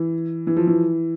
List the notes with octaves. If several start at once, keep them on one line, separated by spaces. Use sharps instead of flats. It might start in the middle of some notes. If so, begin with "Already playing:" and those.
Already playing: E3
E3
F3
E3